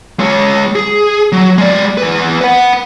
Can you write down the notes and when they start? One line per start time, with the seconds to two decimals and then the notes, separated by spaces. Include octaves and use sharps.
0.19 G#3 C#5
0.75 G#4
1.32 F#3
1.58 G#3 D5
1.98 E2 B4
2.41 B4 F#5